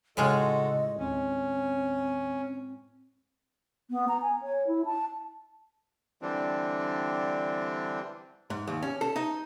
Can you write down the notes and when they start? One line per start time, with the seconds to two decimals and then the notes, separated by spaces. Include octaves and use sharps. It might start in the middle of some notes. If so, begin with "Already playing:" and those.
0.17 A2 C#3 G#3 F4 F#4 A4 D#5
0.99 D#2 C4 C#4
3.91 B3
4.08 A#5
4.22 G#5
4.42 C#5
4.67 E4
4.85 A5
6.22 D3 E3 G3 C4 D4
8.50 G#2
8.67 D#2
8.82 C#4
9.01 A4
9.16 D#4